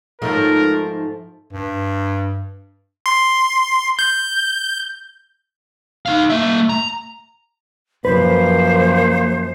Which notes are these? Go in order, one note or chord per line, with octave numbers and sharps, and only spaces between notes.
G#2 F3 A3 A#4
G2
C6
G6
D#4 F5
A#3 E5
A#5
F#2 F3 A#3 B4 C5